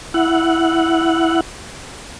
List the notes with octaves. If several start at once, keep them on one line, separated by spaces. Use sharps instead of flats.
E4 F#5